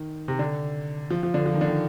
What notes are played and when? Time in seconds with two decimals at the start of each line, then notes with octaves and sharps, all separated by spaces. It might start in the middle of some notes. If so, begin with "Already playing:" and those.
Already playing: D#3
0.28 C3
0.39 D3
1.10 F3
1.23 F3
1.34 D3
1.46 F3
1.54 D#3
1.61 D3
1.68 D#3